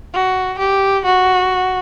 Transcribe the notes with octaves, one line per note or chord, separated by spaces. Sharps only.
F#4
G4
F#4